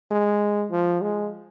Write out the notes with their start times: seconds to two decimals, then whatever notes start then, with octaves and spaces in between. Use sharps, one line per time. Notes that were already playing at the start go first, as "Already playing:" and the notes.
0.11 G#3
0.71 F3
1.02 G#3